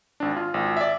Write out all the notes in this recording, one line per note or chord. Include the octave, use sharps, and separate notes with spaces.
G#1 D4
F4
G#1 F4
D5 E5